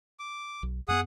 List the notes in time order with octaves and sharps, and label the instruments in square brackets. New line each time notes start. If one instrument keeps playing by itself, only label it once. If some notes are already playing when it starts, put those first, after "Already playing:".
[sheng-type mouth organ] D6
[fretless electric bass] B1
[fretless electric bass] F#2 A#3 B3 [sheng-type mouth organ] G#4 F#5 D#6